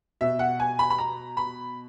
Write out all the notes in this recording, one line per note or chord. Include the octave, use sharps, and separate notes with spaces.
B2 E5
F#5
G#5
B5
B5
A#5
B5